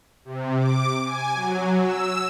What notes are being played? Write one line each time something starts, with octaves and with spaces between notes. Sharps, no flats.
C3
D6
G#5
F#3
E6